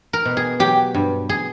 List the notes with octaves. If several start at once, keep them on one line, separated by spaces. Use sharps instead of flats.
A#4
B2
G#4
F#3 G4
G2
G#4